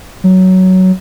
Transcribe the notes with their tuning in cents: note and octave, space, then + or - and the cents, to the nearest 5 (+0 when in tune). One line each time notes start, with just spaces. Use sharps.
F#3 +10